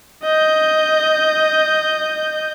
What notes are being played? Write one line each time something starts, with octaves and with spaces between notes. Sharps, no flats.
D#5 G6